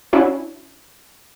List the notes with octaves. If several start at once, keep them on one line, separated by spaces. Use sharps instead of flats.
C#4 D4 E4 F#4